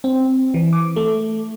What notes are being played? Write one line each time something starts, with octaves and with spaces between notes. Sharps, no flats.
C4
E3
D6
A3